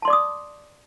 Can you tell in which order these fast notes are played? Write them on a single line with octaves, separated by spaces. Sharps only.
A5 C6 D5 D6 D#6